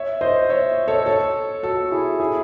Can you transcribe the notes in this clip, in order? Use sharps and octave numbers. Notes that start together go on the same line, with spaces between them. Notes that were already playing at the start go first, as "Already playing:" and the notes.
Already playing: C#5 E5
C5 D#5
C#5 E5
A4 C#5
A4 C#5
F#4 A4
E4 G#4
E4 G#4